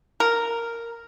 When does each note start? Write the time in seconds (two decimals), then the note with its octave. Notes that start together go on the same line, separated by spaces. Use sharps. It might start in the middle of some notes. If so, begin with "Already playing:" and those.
0.20 A#4